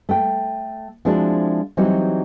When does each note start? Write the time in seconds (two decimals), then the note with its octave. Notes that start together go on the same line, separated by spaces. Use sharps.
0.09 A3 G5
1.05 F3 G#3 C4 D4 E4 F#4
1.77 E3 F#3 G3 C4 D#4 F#4